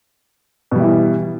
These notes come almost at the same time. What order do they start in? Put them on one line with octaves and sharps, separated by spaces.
B2 G3 E4 E3